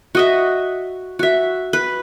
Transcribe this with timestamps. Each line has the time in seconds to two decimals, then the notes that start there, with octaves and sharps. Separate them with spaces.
0.15 F#4 D#5 E5
1.19 F#4 E5
1.73 B4